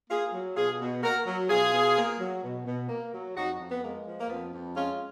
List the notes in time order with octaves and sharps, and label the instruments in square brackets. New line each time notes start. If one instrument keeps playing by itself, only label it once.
[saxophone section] A#3 F4 G#4
F#3
B2 F4 G#4
B2
A#3 F#4 A#4
F#3
B2 F4 G#4
B2
A#3
F#3
B2
B2
A#3
F#3
F2 D#4 F#4
F2
B3
G#3 A#3
F3
A#3
F2 B3
F2
G#3 C#4 F4